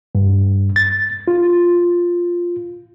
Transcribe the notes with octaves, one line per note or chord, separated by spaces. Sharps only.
G2
A6
F4